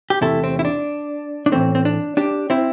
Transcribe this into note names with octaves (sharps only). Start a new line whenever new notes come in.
G4
E2 C3 A3 E4 A4
C4
E4
D4
D4
A2 E3 A3 C4
C4
D4
D4 G4
C4 E4